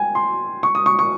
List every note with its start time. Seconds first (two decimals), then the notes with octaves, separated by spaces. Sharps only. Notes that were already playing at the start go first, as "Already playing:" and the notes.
Already playing: G5 G#5
0.15 C6
0.63 C#6
0.75 D#6
0.86 C#6
0.99 C#6